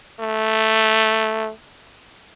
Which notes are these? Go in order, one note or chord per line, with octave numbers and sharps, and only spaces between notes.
A3